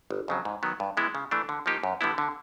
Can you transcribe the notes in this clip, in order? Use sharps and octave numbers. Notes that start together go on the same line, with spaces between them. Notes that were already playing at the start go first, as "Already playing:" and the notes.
G1
F2 C#3 F#3
G#2
D#3 F#3 B3
G2
E3 G#3 B3 E4
C#3
E3 A3 D4
D3
F3 A#3 D#4 G4
F#2
D3 G3 B3 E4
D3